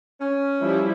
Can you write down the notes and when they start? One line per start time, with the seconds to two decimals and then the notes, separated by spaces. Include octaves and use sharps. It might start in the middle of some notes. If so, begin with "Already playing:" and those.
0.21 C#4
0.61 F3 G3 E4